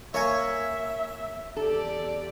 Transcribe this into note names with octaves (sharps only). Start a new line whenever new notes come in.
A#3 C#5 E5 G#5
E2 G4 A4 D5